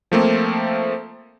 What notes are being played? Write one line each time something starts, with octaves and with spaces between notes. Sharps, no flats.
F3 A3 A#3 C4